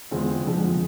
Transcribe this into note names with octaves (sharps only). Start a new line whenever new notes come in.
E2 D3 G#3 C4 F4
F2 D3 F3 G#3